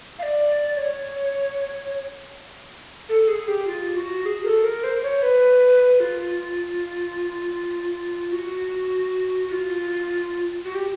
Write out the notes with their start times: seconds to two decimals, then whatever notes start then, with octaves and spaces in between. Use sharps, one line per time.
0.19 F5
0.23 D5
0.77 C#5
3.09 A4
3.28 G#4
3.48 G4
3.67 F4
3.96 F#4
4.26 G#4
4.45 A#4
4.48 A4
4.64 A#4
4.84 C5
5.03 C#5
5.22 B4
6.00 F4
8.32 F#4
9.48 F#4
9.52 F4
10.65 F#4
10.75 G4